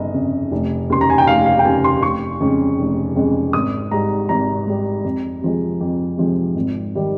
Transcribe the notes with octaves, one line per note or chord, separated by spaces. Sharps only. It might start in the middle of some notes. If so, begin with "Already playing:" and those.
Already playing: G1 C#3 D#5
F2 C#3
F1
D#2 C#3 C6
A#5
G#5
G5
F1 F5
F5
G5
D#2 C#3 G#5
C6
F1 C#6
F2 C#3 G#3
F1
F2 C#3 G#3
G#1 D#6
G#2 G3 A#5
G#1 A#5
G#2 G3
F2
C3 F3 G#3
F2
C3 F3 G#3
G#1
D#3 G3